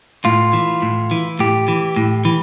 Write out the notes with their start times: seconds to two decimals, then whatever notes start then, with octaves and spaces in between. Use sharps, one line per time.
0.25 A2 F4
0.53 E3
0.82 A2
1.11 E3
1.39 A2 G4
1.68 E3
1.96 A2
2.25 E3